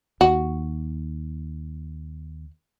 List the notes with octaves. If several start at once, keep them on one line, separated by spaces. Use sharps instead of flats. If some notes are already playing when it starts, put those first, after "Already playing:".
D#2 F#4